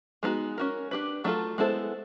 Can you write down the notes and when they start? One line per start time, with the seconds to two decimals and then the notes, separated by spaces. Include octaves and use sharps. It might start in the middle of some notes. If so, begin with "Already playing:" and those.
0.23 G#3 B3 D#4 F#4
0.58 C#4 F#4 A#4
0.91 D4 G4 B4
1.24 F#3 A3 D4 F4 A4
1.58 G#3 B3 E4 A4 C5